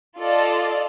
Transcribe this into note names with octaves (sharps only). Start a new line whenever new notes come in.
F4 A4 D5 D#5